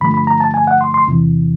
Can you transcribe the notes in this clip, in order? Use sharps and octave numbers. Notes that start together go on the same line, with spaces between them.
G2 D3 F3 A3 B5
B5
A#5
A5
G#5
F#5
C6
C6
E2 C3 E3